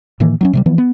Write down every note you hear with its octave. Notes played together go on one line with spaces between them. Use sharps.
A2 D#3 E3 A#3
F#3 C4 C#4
C3 F#3 G3
E3 F3 B3
B3